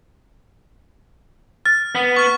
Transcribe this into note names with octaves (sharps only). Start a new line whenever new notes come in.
F6 A6
B3
C#6 F6